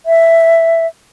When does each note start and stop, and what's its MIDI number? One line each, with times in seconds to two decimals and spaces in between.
0.06 0.86 76